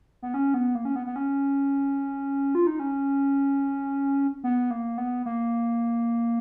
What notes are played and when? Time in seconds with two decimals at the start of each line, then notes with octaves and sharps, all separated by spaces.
0.22 B3
0.34 C#4
0.54 B3
0.75 A#3
0.85 C#4
0.96 B3
1.07 B3
1.16 C#4
2.55 F4
2.67 D#4
2.80 C#4
4.44 B3
4.71 A#3
4.98 B3
5.26 A#3